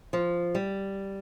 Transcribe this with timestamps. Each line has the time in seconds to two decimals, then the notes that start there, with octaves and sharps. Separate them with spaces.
0.13 F3
0.55 G3